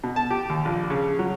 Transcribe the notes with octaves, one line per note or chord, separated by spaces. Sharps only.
B2
A5
G4
D#2
A#1
C#3
F#3